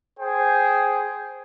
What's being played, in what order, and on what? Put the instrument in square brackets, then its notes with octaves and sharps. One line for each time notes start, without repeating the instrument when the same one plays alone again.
[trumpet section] G#4 C5 G5